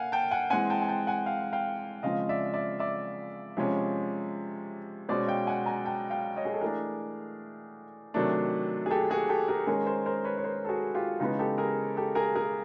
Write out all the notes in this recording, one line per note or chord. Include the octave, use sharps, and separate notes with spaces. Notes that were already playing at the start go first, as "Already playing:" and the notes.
Already playing: A#3 F5 F#5 G#5
G5 A5
F#5 G#5
E3 G#3 C4 F#5 G#5
G5 A5
G#5
G5 A5
F#5 G#5
F5 G5
F5 G5
C#3 F3 G#3 C4 D#5 F5
D5 E5
D5 E5
D5 E5
C3 F3 G#3 C#4
B2 G#3 C#4 C5 D5
F5 G5
F#5 G#5
G#5 A#5
G5 A5
F5 G5
C#5 D#5
G#4
A4
E3 A3 D4 G#4 A#4
C3 D#3 F#3 A3 D4
G#4
G4 A4
F#4 G#4
G4 A4
G#4 A#4
D#3 G#3 C#4 G#4 A#4
A#4 C5
A#4 C5
B4 C#5
C#5
A#4 C5
A4
F#4 G#4
F4 G4
C#3 E3 G#3 B3 D#4
G4 A4
G#4 A#4
G4 A4
G#4 A#4
G#4 A#4